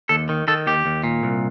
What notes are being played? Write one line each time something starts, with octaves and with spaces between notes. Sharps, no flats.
D#2 A4
D#3
D#3 A4
D#2 G4
D#2
A#2
C2